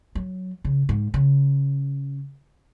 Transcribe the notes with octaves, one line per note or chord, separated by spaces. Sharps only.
F#3
C#3
G#2
C#3